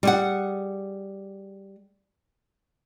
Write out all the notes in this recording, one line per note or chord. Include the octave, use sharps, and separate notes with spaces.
G3 G#4 F#5